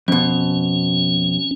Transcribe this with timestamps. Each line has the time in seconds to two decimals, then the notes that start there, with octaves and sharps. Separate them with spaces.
0.08 F2 B2 C#4